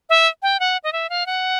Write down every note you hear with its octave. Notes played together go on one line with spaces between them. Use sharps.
E5
G5
F#5
D#5
E5
F5
F#5